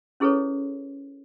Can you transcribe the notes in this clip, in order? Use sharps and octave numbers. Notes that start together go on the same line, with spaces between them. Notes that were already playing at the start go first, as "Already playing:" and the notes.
C#4 E4 G#4 A4 B4 C#5